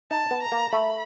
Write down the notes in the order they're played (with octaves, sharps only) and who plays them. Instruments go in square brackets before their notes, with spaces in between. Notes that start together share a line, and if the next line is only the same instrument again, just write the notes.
[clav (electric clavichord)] D#4 [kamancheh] A5
[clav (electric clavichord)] B3
[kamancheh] A#5
[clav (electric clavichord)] A#3
[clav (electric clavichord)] A3 [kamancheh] B5